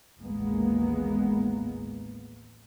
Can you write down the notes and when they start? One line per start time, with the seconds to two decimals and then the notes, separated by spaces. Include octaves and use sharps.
0.21 A1 D#2 G#3 A#3 B3